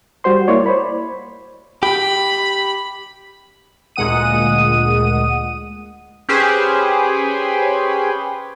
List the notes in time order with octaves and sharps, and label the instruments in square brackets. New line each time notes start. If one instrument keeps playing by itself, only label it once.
[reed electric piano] G3 F#4 C5 C6
A#3 E4 C#5 D5
C5 B5
[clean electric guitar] G4 [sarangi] B5
[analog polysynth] D2 A#2 G#3 F#5 D#6 D#7
C#4 G4 G#4 B4 C5